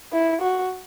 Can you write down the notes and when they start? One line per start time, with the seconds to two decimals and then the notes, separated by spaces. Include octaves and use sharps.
0.13 E4
0.41 F#4